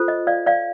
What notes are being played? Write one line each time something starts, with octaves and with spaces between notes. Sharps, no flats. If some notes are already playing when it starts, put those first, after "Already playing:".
Already playing: F4 A4 C5
D#5
D5 F5
D5 F5